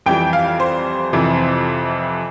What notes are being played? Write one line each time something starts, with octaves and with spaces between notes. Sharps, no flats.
F2 E3 G3 G5
F5
C5
F2 C3 E3